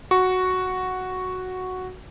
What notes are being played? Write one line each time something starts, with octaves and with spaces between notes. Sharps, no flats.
F#4 C#6